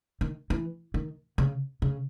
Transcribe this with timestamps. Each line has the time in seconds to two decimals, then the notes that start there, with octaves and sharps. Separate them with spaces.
0.21 D#3
0.50 E3
0.94 D#3
1.38 C#3
1.82 C#3